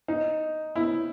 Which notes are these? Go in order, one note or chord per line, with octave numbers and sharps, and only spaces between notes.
D#4
E4